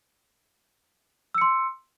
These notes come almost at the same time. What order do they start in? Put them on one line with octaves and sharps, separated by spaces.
E6 C#7 C6